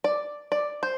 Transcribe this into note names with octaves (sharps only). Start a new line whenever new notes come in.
D5
D5
C5